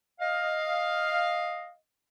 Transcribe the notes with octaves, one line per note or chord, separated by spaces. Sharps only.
D#5 F5